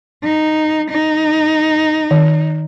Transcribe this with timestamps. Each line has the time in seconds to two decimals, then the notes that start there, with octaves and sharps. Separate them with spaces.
0.24 D#4
0.91 D#4
2.11 D#3